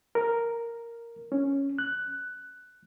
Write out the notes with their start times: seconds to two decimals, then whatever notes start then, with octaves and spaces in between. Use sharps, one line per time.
0.15 A#4
1.32 C#4
1.78 F#6